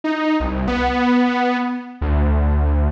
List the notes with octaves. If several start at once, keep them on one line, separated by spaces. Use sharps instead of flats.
D#4
C2
B3
D2